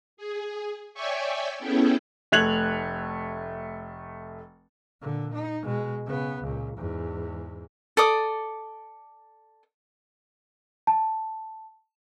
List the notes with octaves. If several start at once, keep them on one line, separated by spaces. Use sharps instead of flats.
G#4
C#5 D5 E5 G5 G#5 C#6
B3 C#4 E4 G#4 A4 G5
F1 A3 F#6 G#6 F7 F#7
A#2 D3
D#4
B2 G#3
C#3 B3
C#2 A#2
E2 G#2
A4 D5 D6 D#6
A5